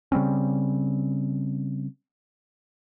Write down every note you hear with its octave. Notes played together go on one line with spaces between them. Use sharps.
C#3 G3 C4 C#4